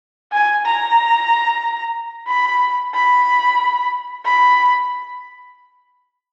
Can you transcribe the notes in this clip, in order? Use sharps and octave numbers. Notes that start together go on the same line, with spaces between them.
G#5
A#5
B5
B5
B5